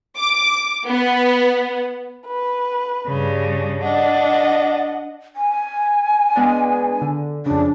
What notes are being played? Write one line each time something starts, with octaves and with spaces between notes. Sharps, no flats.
D6
B3
B4
G2 C#3
D4 D#5 F#5
G#5
G#3 B3 D4
D3
F2 C#3 D4